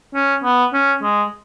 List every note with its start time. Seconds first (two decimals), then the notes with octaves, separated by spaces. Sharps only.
0.15 C#4
0.44 B3
0.73 C#4
1.03 G#3